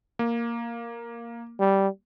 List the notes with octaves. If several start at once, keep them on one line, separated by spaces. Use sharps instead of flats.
A#3
G3